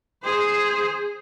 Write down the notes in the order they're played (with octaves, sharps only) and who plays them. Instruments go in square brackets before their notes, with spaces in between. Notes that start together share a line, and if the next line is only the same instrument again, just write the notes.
[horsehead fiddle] G#4 C5